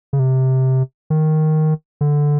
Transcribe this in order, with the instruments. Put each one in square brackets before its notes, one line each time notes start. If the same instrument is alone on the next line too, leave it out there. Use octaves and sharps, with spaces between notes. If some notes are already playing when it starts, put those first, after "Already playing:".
[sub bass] C#3
C3
D#3
D3